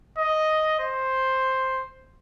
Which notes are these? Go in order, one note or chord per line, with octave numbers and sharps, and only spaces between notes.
D#5
C5